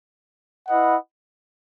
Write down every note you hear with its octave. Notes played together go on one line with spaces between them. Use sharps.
E4 B4 D#5 F#5